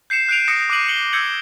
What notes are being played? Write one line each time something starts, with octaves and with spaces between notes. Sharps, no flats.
G6 C7 C#7 E7
F#6 G6 C7 D7 D#7 F7
D#6 G6 A#6 C#7 E7
D6 F#6 C7 D#7 F#7
F#6 C#7 D#7 F#7 G7
E6 G6 G#6 C#7 F#7